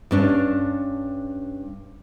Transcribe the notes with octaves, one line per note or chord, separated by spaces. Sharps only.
G2 C#4 D4